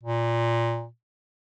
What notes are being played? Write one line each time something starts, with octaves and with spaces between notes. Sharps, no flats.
A#2